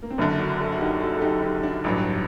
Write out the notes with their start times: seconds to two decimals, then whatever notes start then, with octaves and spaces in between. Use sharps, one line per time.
0.02 A#3
0.10 C4
0.18 F#1 F#2 D3 A#3 D4
0.39 D4 F#4
0.59 F#4 A4
0.72 F#4
0.80 D#4 G4
1.00 F#4 A4
1.17 A4
1.21 D#4 G4
1.42 D#4 G4
1.63 D4 F#4
1.84 A1 G2 F#3